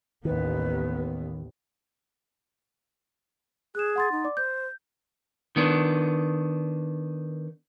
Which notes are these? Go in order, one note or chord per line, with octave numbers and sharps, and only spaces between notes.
A1 D#2 D#3 B3 B4
G#4 F#6 E7
F#5 C6 A6
D#4
D5 D6
C5 G6
D#3 B3 D4